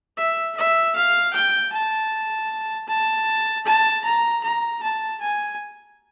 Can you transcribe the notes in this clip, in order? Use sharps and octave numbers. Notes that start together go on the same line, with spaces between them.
E5
E5
F5
G5
A5
A5
A5
A#5
A#5
A5
G#5